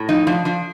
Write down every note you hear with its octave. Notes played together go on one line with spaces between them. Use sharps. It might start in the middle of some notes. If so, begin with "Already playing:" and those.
Already playing: A2
F3 D#4
F3 D4
F3 D4